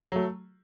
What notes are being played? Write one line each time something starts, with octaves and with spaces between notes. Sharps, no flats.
F#3 A3